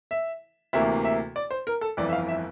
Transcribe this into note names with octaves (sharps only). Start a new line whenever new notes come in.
E5
D2 C3 E3 A#3 E5
E5
D5
C5
A#4
A4
G1 F2 E3 D5
E5
F5
E5